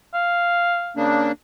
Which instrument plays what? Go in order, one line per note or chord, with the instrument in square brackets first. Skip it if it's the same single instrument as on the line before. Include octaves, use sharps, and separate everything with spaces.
[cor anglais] F5
[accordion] C#3 A#3 D4